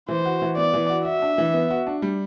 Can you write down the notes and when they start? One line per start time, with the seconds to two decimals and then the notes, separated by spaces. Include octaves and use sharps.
0.08 E3 C5
0.26 F#4
0.42 E3
0.57 B3 D5
0.74 E3
0.90 F#4
1.05 F#4 E5
1.22 D4
1.38 E3
1.54 B3
1.71 F#4
1.87 D4
2.02 G3